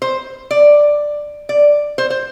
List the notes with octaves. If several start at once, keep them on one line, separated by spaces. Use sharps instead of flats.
C5
D5
D5
C5
C5